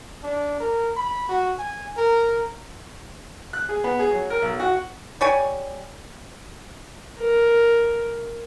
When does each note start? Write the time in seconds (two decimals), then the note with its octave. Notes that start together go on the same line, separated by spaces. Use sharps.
0.23 D4
0.60 A#4
0.96 B5
1.29 F#4
1.59 G#5
1.97 A#4
3.53 F#6
3.69 G#4
3.84 B3
3.99 G#4
4.11 F#3
4.30 A#4
4.42 B1
4.60 F#4
5.21 G3 C#5 G#5
7.20 A#4